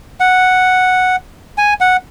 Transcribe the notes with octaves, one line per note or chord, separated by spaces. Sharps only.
F#5
G#5
F#5